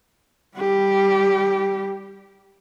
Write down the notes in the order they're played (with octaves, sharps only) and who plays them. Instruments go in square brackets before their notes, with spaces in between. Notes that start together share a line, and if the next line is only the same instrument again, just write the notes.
[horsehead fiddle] G3 G4